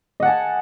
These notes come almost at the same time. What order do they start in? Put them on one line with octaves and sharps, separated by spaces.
D#5 F#5 A5 G#5